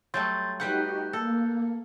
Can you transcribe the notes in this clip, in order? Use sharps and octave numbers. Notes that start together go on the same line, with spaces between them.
F#3 G3 A3 C6 G6 A6
G3 D#4 F#4 G4 B4 F#5 F#6 G6
A#3 A4